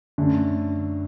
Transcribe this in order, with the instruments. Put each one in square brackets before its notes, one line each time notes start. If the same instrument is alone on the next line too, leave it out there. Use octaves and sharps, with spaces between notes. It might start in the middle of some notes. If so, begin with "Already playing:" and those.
[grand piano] F#2 D3 A3